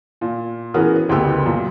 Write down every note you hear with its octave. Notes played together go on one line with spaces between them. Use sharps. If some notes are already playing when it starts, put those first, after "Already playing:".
A#2
E3 B3 C#4 F#4 G#4 A#4
F#1 D2 B3 G4 E6
F#2 A#2